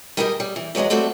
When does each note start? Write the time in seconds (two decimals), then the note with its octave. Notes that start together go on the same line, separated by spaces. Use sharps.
0.17 G3 D#4 E4 G#4 A#4 D#5
0.40 G3
0.56 E3
0.75 E2 F#3 G#3 D4 D#5
0.90 G3 A3 C4 F#4 A4 D5